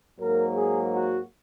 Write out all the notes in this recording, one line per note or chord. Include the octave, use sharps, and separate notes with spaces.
G#2 F#3 A#3 A#4
G#4
F#4